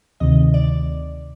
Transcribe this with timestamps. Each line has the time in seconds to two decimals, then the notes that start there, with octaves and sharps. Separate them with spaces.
0.20 D2 C3 D#3 D#5
0.54 D5